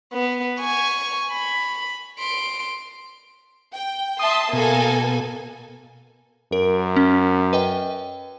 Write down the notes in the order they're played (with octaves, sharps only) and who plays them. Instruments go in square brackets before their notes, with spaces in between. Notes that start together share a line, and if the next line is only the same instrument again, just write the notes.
[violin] B3
G#5 C#6
B5
C6 D7
[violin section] G5
[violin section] E5 A5 C6 [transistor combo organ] D#6
[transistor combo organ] B2 [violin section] A#3 A4 G#5
[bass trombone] F#2 [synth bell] A#4
[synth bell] C#4
B4 D#5 G5